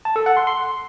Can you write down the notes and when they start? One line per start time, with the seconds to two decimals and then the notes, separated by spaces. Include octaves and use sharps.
0.05 A5
0.16 A4
0.26 F#5
0.37 C6
0.47 C6